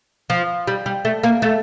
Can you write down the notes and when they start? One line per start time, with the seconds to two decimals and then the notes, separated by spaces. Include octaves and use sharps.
0.30 F3
0.67 G3
0.86 G3
1.05 A3
1.23 A#3
1.42 A3